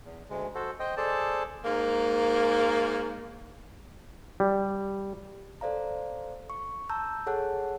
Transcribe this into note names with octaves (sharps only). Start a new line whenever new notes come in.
E2
D2 G#3
F#4 A4 C5
C5 D#5 G5
G#4 A4 C5 D5 A5
G#2 A#3
G3
A4 C5 D5 F5 A#5
C#6
A5 A#5 E6 G6
G#4 A4 C#5 F#5 A5 F#6